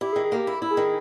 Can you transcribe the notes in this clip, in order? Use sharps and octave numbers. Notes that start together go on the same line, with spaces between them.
E4 G4
G#4
D#3
G#4
A#3 G4
E4
E4
G#4
D#3